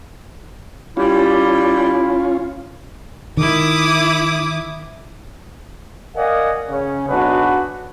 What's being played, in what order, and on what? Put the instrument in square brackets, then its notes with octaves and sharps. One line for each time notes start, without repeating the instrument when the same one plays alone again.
[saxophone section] G3 [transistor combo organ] C#4 F4 [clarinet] E4
[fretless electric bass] D#3 [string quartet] E4 D6 D#6
[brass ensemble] A#4 D5 D#5 F5 F#5 G#5
C#3 C#4
B1 D4 D#4 F#4 G#4 B4